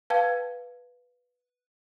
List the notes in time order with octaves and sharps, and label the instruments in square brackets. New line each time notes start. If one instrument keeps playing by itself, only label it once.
[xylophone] B4 F5 G5 A5 G#6